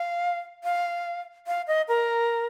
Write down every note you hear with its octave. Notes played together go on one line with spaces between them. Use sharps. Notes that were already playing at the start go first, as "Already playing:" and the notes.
Already playing: F5
F5
F5
D#5
A#4